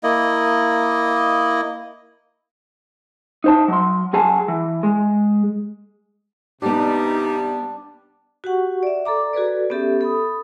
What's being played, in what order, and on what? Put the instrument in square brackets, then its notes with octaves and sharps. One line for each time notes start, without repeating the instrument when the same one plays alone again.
[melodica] A#3 E4 D#5
[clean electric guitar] D#4 C5 A5
F#3 C6
F#3 G#4 G#5 A5
E3
G#3
[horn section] G#2 C3 G3 [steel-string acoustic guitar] B3 G4 [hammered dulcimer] D4 [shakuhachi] D#4
[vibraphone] F#4 G4 F#5 C#6
D5 E5
A4 D5 A#5 D6
F#4 G#4 A4 B4 D5
B3 C#4 G4 A4 E5
A4 B5 D#6